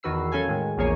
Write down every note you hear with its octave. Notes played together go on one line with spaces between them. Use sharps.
E2 D#3 F#4 B4 E6 C7
F#3 C#4 A4 F5 G#5 G#6
A2 D#3 G#3
A#1 E2 A#3 G#4 C#5 G#5